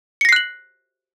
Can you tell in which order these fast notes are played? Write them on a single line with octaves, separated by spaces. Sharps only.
C#7 A#6 C7 F#6 F#7